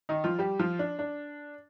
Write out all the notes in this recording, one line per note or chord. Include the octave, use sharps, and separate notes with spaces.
D#3 D#4
F3 F4
G3 G4
F3 F4
D4
D4